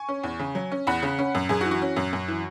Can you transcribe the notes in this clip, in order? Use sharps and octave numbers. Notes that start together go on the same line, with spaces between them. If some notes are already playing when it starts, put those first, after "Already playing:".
Already playing: G#5 C#6
C#4
E2
C#3
F#3
C#4
E2 F#5 B5
C#3
C#4
F#2
F#2 G#4
F#4
E3
F#4
C#4
F#2
F#2
E3